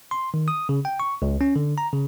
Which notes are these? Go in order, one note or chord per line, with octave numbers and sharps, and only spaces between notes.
C6
D#3
D#6
C#3
G5
C#6
C#2
C#4
D3
A#5
C#3